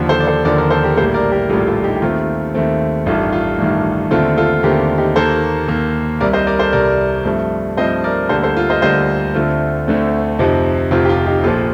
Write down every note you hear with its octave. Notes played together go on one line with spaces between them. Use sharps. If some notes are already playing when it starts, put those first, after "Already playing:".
Already playing: D#2 D3 F3
A4 C5
D5
A4 C5
D#2 D3 F3 A#4 D5
A#4 D5
A4 C5
G4 A#4
A#1 A2 G3 A#3 A4 C5
A#4 D5
G4 A#4
A#1 A2 G3 A#3 F4 A4
F4 A4
D#4 G4
G4
D#2 D#3 A3 C4 F4
D#2 D#3 A3 C4
A1 G2 D#3 A3 F4
F4
A1 G2 D#3 A3
D#2 D3 A3 C4 F4 A4
F4 A4
D#2 D3 A3 C4 G4 A#4
D#4 G4
D#2 D#3 A#3 A4 C5
D#2 D#3 A#3
C2 C3 G3 A#4 D5
C5 D#5
A#4 D5
A4 C5
C2 C3 G3 A#4 D5
G2 F3 A3 C4
G2 F3 A3 C4 C5 D#5
A#4 D5
D2 D3 G3 A#3 A4 C5
A4 C5
F4
C5 D#5
D2 D3 G3 A#3 C5 D#5
D2 D3 A3 C4 F4
D2 D3 A3 C4
F1 F2 C3 F3 C4 D#4
F1 F2 C3 F3 C4 F4
G4
F4
D#4 G4
A#1 A#2 F3 F4 A4